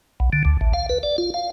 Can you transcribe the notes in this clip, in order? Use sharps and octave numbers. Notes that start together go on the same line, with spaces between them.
B1
D3
D2
A1
F5
B4
D5
F4
F5